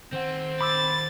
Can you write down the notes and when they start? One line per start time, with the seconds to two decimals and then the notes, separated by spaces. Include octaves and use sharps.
0.12 D#3 C4 F#5
0.61 B5 D6 E6 A6